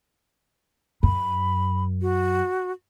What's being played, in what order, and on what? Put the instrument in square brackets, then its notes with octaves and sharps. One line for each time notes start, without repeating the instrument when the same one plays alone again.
[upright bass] F#2 [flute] B5
[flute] F#4